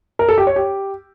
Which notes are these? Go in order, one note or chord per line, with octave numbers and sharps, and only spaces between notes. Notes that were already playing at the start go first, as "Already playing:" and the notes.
A#4
A4
G4
C#5
G4